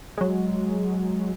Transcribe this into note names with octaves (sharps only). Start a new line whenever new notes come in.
F#3 G#3